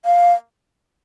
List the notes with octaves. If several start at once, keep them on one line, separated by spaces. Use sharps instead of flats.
F5